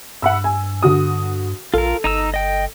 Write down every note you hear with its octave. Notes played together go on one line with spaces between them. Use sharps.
G2 F#5 B5 E6
G#5
D3 F#4 D#6
A#1 F4 A4 A#4
G1 D#4 A#5 E6
D#5 G5